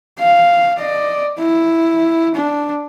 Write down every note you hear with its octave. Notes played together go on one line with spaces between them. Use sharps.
F5
D5 D#5
E4
D4